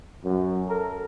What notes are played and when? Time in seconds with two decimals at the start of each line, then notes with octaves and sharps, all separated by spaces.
0.24 F#2
0.68 A4 A#4